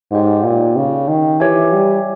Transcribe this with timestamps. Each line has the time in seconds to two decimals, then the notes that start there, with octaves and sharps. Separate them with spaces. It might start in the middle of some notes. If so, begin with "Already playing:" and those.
0.11 G#2 D#4 G4 C#5 G5
0.44 A#2
0.76 C#3
1.08 D#3
1.40 E3 G4 C#5 E5 G#5
1.73 G3